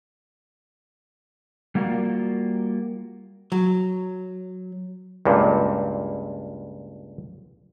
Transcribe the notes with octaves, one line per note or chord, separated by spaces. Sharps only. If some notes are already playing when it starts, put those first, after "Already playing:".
G3 A#3 F4 F#4 A#4 D5
F#3
C#2 G2 A#2